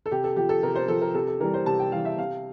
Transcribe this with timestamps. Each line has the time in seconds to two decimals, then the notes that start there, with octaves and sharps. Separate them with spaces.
0.06 A4
0.11 C3 G4
0.24 A4
0.36 F3 G4
0.49 A4
0.63 C3 A#4
0.75 C5
0.88 F3 A4
1.02 A#4
1.14 C3 A4
1.27 A4
1.40 E3 G3 A#4
1.54 C5
1.66 C3 A5
1.79 G5
1.92 E3 G3 F5
2.05 E5
2.18 C3 F5